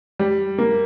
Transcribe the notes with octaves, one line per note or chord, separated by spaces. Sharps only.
G3
A#3